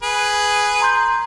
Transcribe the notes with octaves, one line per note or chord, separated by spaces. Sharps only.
G#4 B4
A#5 C6 G6